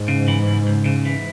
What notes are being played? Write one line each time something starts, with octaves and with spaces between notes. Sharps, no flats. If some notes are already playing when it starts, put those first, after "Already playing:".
Already playing: G#2
C#3
E3
C#2
C#2
C#3
E3